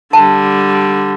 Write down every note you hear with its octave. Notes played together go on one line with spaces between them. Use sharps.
D3 G3 A5